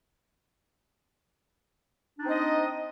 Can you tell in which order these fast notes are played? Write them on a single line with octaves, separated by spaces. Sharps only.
D4 D#4 C4 D#5